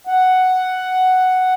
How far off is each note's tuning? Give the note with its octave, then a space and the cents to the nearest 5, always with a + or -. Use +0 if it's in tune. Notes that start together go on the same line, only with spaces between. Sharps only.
F#5 +5